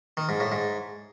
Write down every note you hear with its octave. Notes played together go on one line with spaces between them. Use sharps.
D#3
G#2
A2
G#2